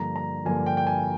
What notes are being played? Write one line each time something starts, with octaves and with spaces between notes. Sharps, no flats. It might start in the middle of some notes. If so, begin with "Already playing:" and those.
Already playing: G2 D3 F3 A#3 A#5
A#5
G2 D3 F3 A#3 G#5
G5
G5
G#5